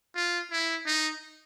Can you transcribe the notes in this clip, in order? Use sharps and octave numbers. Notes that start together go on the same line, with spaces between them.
F4
E4
D#4